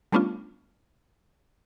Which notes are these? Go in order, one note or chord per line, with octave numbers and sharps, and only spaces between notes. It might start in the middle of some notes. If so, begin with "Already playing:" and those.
G3 A3 B3 C#4 D4 F4